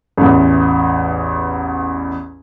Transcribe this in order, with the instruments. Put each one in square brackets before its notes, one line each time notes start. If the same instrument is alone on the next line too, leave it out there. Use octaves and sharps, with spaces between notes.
[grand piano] A1 E2